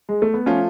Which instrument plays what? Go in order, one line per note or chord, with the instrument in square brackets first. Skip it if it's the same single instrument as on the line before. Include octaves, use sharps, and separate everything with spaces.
[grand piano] G#3
A3
B3
[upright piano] F3 A3 F4 [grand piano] C#4